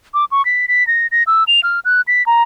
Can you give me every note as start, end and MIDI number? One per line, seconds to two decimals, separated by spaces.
0.14 0.25 86
0.32 0.45 85
0.45 0.66 95
0.68 0.86 95
0.87 1.07 94
1.12 1.23 94
1.27 1.44 88
1.48 1.60 101
1.63 1.80 89
1.85 2.01 90
2.08 2.25 95
2.26 2.43 82